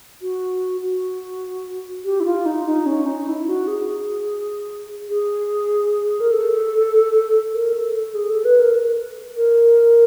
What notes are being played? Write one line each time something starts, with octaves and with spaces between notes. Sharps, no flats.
F#4
F#4
G4
E4
F4
D#4
D#4
C#4
D#4
E4
F#4
G#4
G#4
A#4
A4
A#4
A4
A4
G#4
A4
B4
A#4
A#4